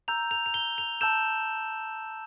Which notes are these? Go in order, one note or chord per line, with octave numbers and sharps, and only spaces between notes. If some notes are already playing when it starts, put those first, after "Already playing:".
A#5 E6 G6 F7
F7
F7
G7
F7
A5 E6 G6 E7